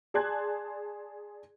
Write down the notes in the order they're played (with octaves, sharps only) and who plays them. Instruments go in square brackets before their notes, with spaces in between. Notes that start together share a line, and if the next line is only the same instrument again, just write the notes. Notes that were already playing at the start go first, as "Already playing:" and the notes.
[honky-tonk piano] G#4 D5 A5 C6 F#6 G#6